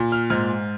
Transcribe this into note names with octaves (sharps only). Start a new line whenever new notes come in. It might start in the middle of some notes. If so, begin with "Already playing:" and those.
Already playing: A#2
F6
G#2 F6